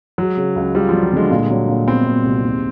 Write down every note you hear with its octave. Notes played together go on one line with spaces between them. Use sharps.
F#3 G#3
C#3
C#2
G3 F4
F3
G3
F#3
D3 G#3
A#2
F#3
A#2
B3 C4
A#2
C2
D#2